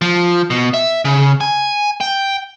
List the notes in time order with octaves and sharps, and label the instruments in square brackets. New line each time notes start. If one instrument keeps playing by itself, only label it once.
[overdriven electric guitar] F3
B2
E5
C#3
G#5
G5